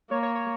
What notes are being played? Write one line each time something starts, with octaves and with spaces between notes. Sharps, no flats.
A#3 C#5
C#5
C#5